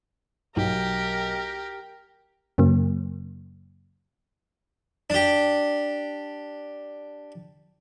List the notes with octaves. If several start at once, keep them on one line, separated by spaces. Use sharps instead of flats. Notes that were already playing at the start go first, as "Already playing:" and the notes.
B1 G4 A#4
F#2 C#3 F#3 A#3
D4 G4